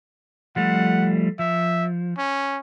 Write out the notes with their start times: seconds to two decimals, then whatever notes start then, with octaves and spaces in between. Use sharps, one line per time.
0.56 F3 G3 A3 F#5
1.39 F3 E5
2.18 C#4